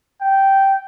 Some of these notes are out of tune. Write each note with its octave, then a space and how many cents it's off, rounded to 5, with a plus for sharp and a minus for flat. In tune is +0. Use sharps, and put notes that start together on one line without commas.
G5 -10